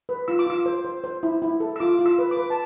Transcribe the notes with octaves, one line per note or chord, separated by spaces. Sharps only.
B4
F4 E6
D6
F4 E6
C5
C5
C5
E4
E4
A4
E6
F4 D6
F4
E6
B4
D6
B4
A5